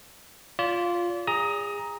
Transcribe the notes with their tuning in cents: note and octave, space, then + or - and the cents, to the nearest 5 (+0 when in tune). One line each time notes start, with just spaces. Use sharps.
F4 +0 D5 -35
G#4 -30 A#5 +5 D#6 +25